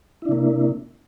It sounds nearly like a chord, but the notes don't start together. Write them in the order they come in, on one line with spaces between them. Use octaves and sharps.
E4 D4 C3 A#3